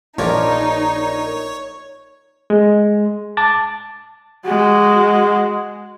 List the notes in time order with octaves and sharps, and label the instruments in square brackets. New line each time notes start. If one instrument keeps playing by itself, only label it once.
[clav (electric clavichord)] A#1 F3 [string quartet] D#4 [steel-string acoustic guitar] A#4 D5 [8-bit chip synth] C#5
[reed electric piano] G#3
A5 D6 A6
[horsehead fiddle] G#3 F#4